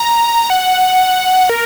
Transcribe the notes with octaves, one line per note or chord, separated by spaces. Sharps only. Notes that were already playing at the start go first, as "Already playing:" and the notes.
Already playing: A#5
F#5
A#4